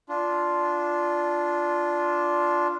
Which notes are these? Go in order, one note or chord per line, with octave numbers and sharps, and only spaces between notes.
D4 F4